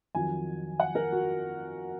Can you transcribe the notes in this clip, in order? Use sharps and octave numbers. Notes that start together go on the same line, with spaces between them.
F2 D#3 F#3 G#5
F#5
A#4
F#4